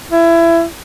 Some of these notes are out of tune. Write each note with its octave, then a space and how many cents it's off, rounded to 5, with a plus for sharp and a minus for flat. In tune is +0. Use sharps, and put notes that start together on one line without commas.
E4 +25